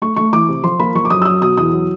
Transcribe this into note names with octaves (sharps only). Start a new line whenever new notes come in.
A3 C#6
A3 C#6
E3 D6
C3
F3 C6
A#3 B5
F3 C#6
D6
F#2 D#6
E6
F#3 D#6
B2 D#6
E2 D#6
F#3